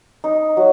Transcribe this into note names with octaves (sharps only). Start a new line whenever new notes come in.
D#4
F#3